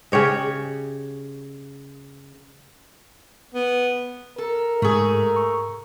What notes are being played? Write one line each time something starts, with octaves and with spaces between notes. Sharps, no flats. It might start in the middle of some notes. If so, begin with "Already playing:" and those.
C#3 G4 C#5 D#5
B3
A4 A#4
G#2 A3 G#4
C#6